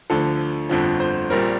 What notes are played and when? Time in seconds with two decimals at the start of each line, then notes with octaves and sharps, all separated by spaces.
0.10 D2 D3 F3 A4
0.69 G1 F2 D3 F3
1.00 C5
1.30 A#1 A#2 G3 C4 A#4